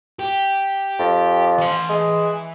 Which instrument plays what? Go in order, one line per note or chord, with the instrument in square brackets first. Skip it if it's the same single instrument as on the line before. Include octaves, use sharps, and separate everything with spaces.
[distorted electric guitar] G4
[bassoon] F2
[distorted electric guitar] E3 C6
[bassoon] G#3